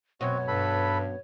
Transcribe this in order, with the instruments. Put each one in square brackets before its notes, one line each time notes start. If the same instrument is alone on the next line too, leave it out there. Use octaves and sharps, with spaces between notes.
[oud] F#2 B2 [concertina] C4 F#4 [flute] C#5
[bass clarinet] G2 [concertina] A4 B4 B5